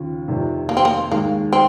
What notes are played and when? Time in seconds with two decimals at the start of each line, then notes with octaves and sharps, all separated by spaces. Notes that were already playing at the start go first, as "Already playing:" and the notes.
Already playing: D#2 C#3 F3
0.28 F1 F2 C3 D#3
0.69 A#3
0.77 C4
0.85 A#3
1.11 D#2 D#3 G#3 A#3
1.53 C4